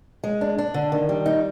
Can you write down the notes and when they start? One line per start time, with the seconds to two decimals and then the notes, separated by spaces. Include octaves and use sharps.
0.24 G#3
0.41 D4
0.58 D4
0.74 D3
0.92 D#3
1.09 G3
1.26 D#4